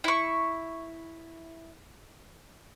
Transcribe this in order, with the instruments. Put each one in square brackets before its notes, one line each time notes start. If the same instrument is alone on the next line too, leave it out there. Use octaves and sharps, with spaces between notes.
[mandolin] E4 C#6